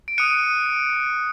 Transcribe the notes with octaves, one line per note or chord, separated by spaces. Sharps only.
D7
D#6 F#6 C#7 D#7